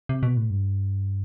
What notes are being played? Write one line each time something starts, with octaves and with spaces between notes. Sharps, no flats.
C3
B2
A2
G2